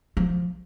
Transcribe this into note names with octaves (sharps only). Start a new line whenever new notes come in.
F3